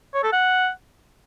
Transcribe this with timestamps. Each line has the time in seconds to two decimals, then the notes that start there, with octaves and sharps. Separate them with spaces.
0.14 C#5
0.23 A4
0.33 F#5